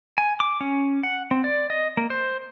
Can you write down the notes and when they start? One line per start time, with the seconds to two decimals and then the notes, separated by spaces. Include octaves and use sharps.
0.18 G#5
0.40 D6
0.61 C#4
1.03 F#5
1.31 C4
1.44 D5
1.70 D#5
1.97 A#3
2.10 C5